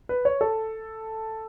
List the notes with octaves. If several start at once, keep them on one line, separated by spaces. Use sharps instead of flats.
B4
C#5
A4